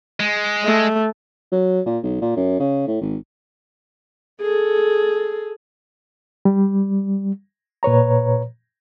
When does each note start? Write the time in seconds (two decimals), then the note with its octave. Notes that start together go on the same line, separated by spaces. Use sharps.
0.20 G#3
0.65 A3
1.52 F#3
1.86 A#2
2.03 B1
2.21 A#2
2.36 F#2
2.60 C#3
2.87 A2
3.01 G#1
4.41 G#4 A4
6.45 G3
7.83 A#2 B4 C#5 A#5